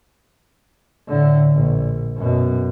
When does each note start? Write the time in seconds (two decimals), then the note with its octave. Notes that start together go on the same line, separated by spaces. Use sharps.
1.08 A2 D3
1.55 A#1
2.17 F#2 B2